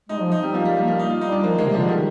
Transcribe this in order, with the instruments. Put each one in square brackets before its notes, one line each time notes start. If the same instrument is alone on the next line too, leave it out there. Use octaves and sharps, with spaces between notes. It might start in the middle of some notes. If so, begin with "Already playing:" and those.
[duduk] G#3 [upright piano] D#4
[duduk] F3
[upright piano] D#4
[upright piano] G3 [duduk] C4
[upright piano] F3 [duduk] A#3
[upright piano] G3
[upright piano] F3 [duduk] A#3
[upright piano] G3
D#4
F4
[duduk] G3 [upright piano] D#4
[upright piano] D4
[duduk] F3 [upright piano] A#3
[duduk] D#3 [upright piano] G#3
[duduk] C3
[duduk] D3 [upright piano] F3
[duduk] D#3 [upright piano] G3